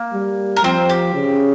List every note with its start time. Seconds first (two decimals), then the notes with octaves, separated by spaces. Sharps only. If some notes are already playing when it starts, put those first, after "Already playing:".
Already playing: A#3
0.13 G3
0.57 A#4
0.64 F3 C4 C5
0.89 G4
1.14 C#3